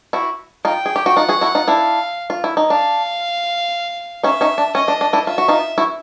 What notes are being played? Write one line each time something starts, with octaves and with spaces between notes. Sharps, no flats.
E4 F#4
D#4 F4 G5
G#4
G4
F#4
D#4 F4 F#5
F#4 G#4
E4 F#4
D#4 F4
D4 E4 F5
F4
E4
D#4
D4 F5
C#4 D#4 E5
C#4 D#4
D4
C#4 D#5
D4
D4
D4 E4
F4 E5
F#4
D#4 F4
E4 F#4